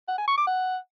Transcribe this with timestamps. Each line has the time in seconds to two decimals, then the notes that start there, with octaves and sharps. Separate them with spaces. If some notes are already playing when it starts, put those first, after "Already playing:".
0.08 F#5
0.18 G#5
0.28 C#6
0.38 D6
0.47 F#5